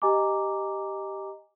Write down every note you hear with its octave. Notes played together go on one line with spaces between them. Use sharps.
G4 D#5 G#5 A#5 D6